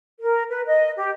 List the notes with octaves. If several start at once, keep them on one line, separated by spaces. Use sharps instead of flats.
A#4
B4
D#5
G4